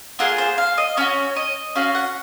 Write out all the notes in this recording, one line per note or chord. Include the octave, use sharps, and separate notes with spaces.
A#3 F4 G#4 F#5
C5
F5
D#5
C#4 F#4 C#5
D#5
C#4 F#4 F5
F#5